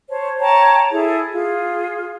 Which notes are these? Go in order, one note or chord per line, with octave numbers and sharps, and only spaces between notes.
C5 C#5 A5
C#5 G5 A5 A#5
E4 G#4 A4
F4 G#4